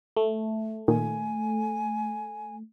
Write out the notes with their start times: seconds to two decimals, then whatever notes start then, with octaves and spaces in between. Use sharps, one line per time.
0.17 A3
0.88 A#2 D#3 G#5